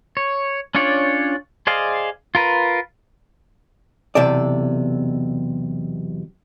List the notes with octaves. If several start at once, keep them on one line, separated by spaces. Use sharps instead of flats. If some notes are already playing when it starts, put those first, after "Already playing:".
C#5
C#4 D4 F4 C#5 D5
G#4 C5 D5 D#5 F5
F4 A#4 B4
B1 E2 C3 A4 D5